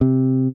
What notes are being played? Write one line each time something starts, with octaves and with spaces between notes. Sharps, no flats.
C3